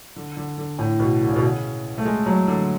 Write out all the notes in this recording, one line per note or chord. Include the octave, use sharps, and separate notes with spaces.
D3
D3
D3
A2
B2
D3
C#3
B2
C#3
A3
G#3
F#3
D3